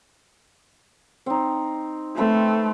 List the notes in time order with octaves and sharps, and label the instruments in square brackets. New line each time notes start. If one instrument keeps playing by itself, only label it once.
[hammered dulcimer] C4 D#4
[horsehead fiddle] A3 [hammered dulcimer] C4 A4 B4